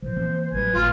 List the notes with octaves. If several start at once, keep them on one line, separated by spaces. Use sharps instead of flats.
A#2 E3 F3 C5
E3 A#3 C4
A1 F#3 G3 B4 G#5 G#6
G1 A2 F4